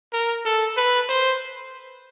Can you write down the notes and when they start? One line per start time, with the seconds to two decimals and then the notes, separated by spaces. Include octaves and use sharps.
0.13 A#4
0.45 A4
0.77 B4
1.09 C5